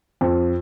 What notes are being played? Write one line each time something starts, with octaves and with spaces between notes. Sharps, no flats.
F2